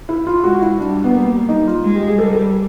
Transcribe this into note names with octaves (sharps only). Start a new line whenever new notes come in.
E4
F4
G#3 F#4
E4
G3 D4
B3
A#3
D#4
F4
G#3
G4
G#4
G3 A4
A#4
A4